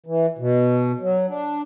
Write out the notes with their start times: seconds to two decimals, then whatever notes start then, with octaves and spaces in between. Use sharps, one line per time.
0.06 E3
0.38 B2
1.01 F#3
1.29 D4